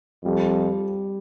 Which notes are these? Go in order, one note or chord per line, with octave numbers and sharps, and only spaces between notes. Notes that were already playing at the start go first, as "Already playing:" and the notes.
F2 G3